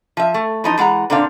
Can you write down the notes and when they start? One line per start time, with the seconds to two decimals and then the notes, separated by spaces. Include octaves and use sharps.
0.17 F3 E5
0.34 A3
0.64 E3 F3 D#4
0.78 E3 G#3 F#5 A#5
1.10 A#2 D3 C4 D4 F5